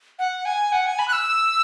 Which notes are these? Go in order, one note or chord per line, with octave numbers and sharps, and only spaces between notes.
F#5
G#5
F#5
G#5
B5
F#6
E6